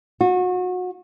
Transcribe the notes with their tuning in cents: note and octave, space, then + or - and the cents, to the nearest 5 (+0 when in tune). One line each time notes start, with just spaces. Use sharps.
F#4 -30